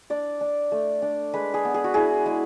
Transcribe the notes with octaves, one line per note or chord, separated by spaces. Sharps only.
D4 D5
D4
A3
D4
G#3 B4
G#4
B3
G#4
F#4
E4 G#4
G#3